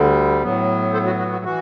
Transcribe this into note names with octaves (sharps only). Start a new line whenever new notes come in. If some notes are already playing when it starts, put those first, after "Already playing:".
Already playing: D2 D3 G3
A2 F#3 B3
A4 C5
F#4
F#4
F#4
E3 F#4